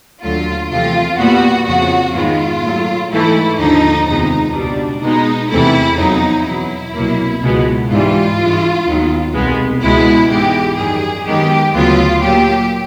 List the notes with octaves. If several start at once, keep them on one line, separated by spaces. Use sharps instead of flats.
D#2 D3 F#3 A3 F4
E2 C3 F3 A3 F4
A#2 G3 B3 F#4
F2 C#3 F3 F#4
G#2 D#3 G#3 B3 F4
A#2 F#3 A3
G#2 E3 A3 E4
D#2 D3 F3 D#4
F2 C3 D#3 G#3 B3 D#4
C#2 B2 G3 D4
B2 G#3 B3 D#4
E2 C3 E3 A3 E4
F2 C#3 F#3 B3 D#4
E2 B2 F#3 E4
C2 B2 F#3 A#3
C#2 B2 G#3 B3
G#2 E3 G3 F4
G2 E3 G#3
D#2 D#3 F#3 B3
C2 B2 G#3 B3
C#2 B2 G#3 B3 E4
G#2 E3 G#3 B3 G4
F#2 D#3 G3 G#4
F#2 D#3 G#3 B3 G4
D2 C#3 F#3 B3 F4
A#2 F#3 A#3 G4